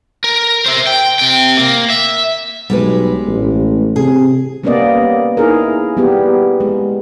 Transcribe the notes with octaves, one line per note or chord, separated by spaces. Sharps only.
A#4
C5 E5
G5
C3 G5
A#3
E5
B1 G3 G#3 B4
A1
C3 G#4
G3 A#3 B3 C#4 D5 D#5
D#4 E4 G#4 A#4
G3 B3 G4
G#3